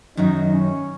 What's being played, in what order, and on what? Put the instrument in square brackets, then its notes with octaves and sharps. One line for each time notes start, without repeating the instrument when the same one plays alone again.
[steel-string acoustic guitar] F#2 D#3 F#3 [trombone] D#4
[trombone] C#4